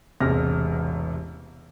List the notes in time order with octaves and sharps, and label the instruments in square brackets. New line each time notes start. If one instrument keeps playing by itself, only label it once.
[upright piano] E1 A1 C3 F6 A#6